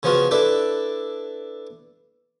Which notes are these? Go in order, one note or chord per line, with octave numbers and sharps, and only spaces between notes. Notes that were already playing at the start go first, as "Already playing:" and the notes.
C#3 F3 B3 F4 F#4
D4 E4 A4 B4 D5